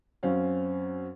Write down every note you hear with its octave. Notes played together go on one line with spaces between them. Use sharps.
F#2 C4 C#4 F5